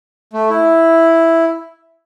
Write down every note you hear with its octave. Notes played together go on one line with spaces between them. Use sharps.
A3
E4